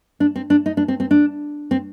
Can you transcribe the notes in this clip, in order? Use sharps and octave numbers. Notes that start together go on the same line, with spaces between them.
D4
C4
D4
D#4
D4
C4
C4
D4
C4